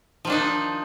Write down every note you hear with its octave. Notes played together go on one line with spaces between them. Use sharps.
D#3 F3 D4 D#4